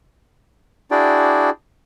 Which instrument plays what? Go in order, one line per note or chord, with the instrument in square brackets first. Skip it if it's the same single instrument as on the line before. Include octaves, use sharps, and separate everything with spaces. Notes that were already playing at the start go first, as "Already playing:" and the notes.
[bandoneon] D4 E4 F#4 G#4 D5 G5